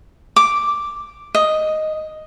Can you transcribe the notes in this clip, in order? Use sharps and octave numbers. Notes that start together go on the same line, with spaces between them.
D6
D#5